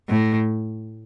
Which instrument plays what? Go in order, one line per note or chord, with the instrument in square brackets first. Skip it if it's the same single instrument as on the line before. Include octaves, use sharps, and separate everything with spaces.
[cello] A2